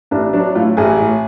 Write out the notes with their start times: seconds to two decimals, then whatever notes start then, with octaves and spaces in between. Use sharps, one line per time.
0.11 A1 D4
0.33 F#3 D4
0.55 A2 F4
0.77 A1 G#4
1.00 A2